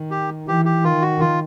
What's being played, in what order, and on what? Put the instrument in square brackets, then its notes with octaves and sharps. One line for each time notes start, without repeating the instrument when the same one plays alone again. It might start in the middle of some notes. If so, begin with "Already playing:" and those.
Already playing: [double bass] D#3
[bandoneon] G4
[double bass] E3 [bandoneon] G4
[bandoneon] G4
[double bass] D#3 [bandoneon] F4
[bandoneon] F#4
F4